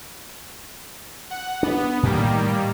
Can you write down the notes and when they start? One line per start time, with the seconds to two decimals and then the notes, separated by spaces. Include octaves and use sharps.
1.31 F#5
1.63 B3 D4
2.03 A2 D#3 G3 A#3